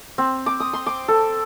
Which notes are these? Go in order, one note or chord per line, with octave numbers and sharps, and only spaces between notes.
C4
D6
D#6
C6
D6
A4